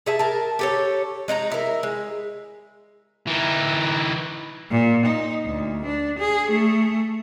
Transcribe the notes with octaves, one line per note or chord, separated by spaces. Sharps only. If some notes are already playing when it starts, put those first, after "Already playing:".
G#4 E5 A5
A#4 A5
G4 A4 C#5
G#3 D#4 E4 A#5
E4 A#4
G#3
E3 D#4
A#2
D#4
D2
D4
G#4
A3